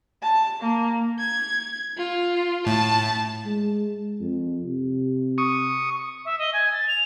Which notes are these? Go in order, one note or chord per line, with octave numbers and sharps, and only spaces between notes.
A5
A#3
G#6
F4
A2 A5
G#3
F2
C3
C#6 D#6
E5
D#5
G#5
A6
F7